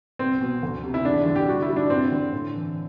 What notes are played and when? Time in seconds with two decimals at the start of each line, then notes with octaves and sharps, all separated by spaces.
0.19 C2 C4
0.41 B2
0.63 D2
0.83 C3
0.94 E4
1.05 E2 D4
1.26 D3
1.35 G4
1.48 G3 F#4
1.62 E4
1.68 G3
1.76 D4
1.90 G2 C4
2.12 D3
2.33 A2
2.54 E3